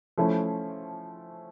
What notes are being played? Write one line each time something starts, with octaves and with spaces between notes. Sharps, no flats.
F3 A3 C#4 E4